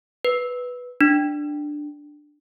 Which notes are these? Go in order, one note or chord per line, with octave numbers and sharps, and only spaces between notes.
B4
D4